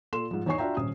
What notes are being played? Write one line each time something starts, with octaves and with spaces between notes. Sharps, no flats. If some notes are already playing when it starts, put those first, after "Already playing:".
A#2 A4 C6 E7
G#2 F3
E2 D#4 C#5 G#5 C#6 C7
D4 F4 F#4 E5 G5 A#5
D#1 C#4 D#6